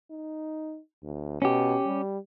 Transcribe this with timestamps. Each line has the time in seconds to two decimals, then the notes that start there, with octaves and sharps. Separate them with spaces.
0.11 D#4
1.03 D2
1.42 B2 C#4 G4
1.86 G3